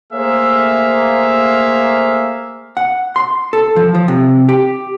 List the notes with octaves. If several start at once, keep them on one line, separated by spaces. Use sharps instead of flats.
A3 A#3 G#4 C5 E5 F5
F#5
C6
A4
F3
F3
C3
G4